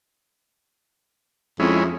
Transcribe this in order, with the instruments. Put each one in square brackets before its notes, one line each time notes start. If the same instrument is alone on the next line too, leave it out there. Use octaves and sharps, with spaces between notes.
[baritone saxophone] F2 [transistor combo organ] G#3 C#4 E4